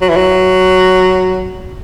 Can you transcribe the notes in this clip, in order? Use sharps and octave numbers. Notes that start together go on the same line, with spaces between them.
F#3
E3
F#3